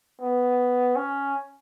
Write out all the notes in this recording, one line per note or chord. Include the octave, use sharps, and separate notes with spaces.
B3
C#4